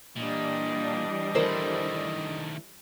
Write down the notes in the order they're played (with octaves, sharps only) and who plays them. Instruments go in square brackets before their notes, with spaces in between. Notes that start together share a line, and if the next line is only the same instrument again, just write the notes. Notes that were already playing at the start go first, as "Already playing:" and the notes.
[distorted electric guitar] A#2 [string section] E3 G3 D4 [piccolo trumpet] D#5
[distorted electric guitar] D#3 A3 [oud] E4 A#4 C5